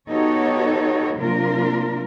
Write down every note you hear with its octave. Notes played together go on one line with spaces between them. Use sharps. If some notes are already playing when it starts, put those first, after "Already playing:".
B3 D#4 F#4 G4 A4 C#5
C3 F#3 A#3 D4 F4 A#4